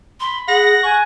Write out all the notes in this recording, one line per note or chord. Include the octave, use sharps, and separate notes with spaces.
B5 C6
G#4 F#5 A#6
G#5 C#6 F#6